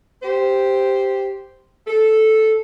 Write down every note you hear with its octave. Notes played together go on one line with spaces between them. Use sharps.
G4 C5
A4